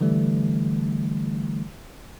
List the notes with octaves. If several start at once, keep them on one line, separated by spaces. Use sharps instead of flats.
D3 E3 G3 A3